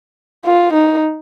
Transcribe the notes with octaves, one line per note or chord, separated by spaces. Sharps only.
F4
D#4